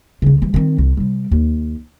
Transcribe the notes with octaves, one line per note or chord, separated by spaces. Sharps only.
C#2 C#3
E3 G3
D#3 C4
C2
C3 G3
D#2